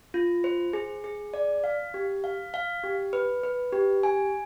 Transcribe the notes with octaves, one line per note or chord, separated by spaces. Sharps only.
F4
C5
G#4
G#4
D5
F5
G4
F5
F5
G4
B4
B4
G4
G#5